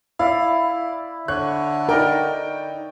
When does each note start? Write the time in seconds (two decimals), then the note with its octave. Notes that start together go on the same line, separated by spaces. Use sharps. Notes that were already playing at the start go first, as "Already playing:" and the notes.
0.19 E4 D5 F5
1.28 D3 C#5 F#6
1.89 D#4 A#4 D5 G5